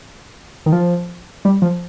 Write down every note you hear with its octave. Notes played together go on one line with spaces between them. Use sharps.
D#3
F3
G3
F3